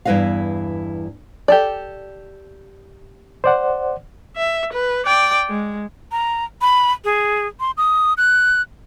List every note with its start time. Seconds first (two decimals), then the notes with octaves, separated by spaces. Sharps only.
0.05 E2 G2 E4 B4 D#5 F5
1.48 G4 A4 D5
3.44 C5 D5 F#5
4.36 E5
4.73 B4
5.06 D5 G5
5.49 G#3
6.12 A#5
6.61 B5
7.04 G#4
7.60 C6
7.77 D#6
8.18 F#6